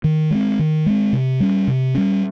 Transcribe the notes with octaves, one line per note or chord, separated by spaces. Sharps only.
D#3
G#3 C4
D#3
G#3 C4
C3
G3 C#4
C3
G3 C#4